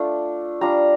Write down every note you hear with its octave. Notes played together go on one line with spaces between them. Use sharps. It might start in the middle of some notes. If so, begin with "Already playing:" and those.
Already playing: A3 D4 F4
G3 D4 F4 A#5